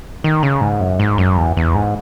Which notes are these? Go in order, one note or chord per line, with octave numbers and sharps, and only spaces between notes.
D#3
C#3
G#2
F#2
G#2
F#2
E2
E2
G#2